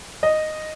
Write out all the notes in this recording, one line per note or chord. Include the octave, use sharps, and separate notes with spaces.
D#5